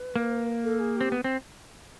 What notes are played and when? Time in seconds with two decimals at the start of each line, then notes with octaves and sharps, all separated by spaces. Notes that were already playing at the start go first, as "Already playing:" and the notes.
Already playing: B4
0.16 A#3
0.64 A4
0.80 G#4
0.96 C4 G4
1.12 B3
1.24 C4